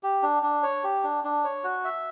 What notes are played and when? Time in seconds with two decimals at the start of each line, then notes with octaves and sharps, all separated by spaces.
0.03 G4
0.23 D4
0.43 D4
0.63 C#5
0.84 G4
1.03 D4
1.24 D4
1.44 C#5
1.64 F#4
1.85 E5